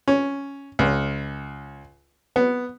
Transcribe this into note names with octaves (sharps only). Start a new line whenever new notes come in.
C#4
C#2
B3